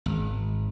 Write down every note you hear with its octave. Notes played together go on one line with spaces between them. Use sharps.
G#1